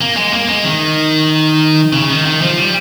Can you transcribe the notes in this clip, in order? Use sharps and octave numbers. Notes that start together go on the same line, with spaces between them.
A#3
G#3
A#3
G#3
D#3
C#3
D#3
D#3
F3
G3